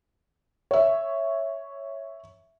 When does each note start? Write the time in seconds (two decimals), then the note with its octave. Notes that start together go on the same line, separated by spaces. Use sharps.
0.71 C#5 E5